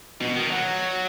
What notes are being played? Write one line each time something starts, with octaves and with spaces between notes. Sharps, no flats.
B2
D#3
F#3